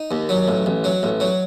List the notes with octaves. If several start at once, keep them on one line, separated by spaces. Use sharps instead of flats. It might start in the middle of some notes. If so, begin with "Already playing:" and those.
Already playing: D#4
D#2
F#3
A1
A1
F#3
A1
F#3